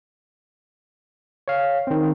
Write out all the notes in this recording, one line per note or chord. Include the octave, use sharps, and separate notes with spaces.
C#5 F5
D#3 C4